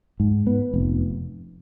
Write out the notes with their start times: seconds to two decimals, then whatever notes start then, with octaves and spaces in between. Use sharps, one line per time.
0.20 G#2
0.47 B3
0.74 F1